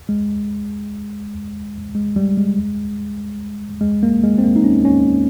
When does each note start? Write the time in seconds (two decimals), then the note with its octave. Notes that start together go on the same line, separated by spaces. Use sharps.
0.09 G#3
1.95 G#3
2.16 G3
2.37 G#3
3.81 G#3
4.03 A#3
4.23 G#3
4.38 C4
4.44 A#3
4.56 D#4
4.64 C#4
4.85 C#4